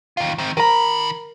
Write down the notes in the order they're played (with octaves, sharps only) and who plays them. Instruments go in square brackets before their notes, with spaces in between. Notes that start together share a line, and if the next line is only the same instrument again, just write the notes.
[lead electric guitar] D#3 F4
D#3 C4
[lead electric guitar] D#3 B5 [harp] A#4 A#5